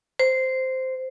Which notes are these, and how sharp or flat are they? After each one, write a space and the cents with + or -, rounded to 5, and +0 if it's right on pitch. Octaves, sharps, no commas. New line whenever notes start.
C5 -10